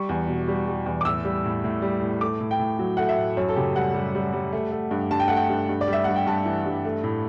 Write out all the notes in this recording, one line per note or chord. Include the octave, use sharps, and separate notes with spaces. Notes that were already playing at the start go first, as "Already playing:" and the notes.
Already playing: G3 C#6
E2
B2
G3
G3
E2
D6
A2 E6
G3
A2
A2
G3
A2
A3 D6
A2
G5
A2
F#3
A3 F#5
E5
A2
F#2 C#5
A4
C#3 G4
G3 F#5
G3
G3
G3
A3
A3
G2
G2 A5
G5
A3 F#5
G5
G2
G2
D5
G3
E5
G2 F#5
G5
G2 A5
E3
G2
A3
A2